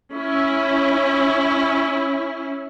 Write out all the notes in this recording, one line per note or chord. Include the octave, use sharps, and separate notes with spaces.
C#4 E4